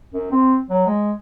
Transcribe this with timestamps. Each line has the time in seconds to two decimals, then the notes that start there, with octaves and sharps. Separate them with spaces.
0.13 F#2
0.31 C4
0.70 F#3
0.87 G#3